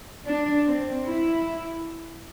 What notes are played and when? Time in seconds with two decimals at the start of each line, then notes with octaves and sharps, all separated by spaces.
0.26 D4
0.66 C4
1.06 E4